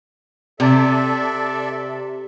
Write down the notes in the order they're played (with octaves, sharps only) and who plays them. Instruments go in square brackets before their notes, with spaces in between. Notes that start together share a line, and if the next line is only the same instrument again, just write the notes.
[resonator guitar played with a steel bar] C3 [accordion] A4 D5 E5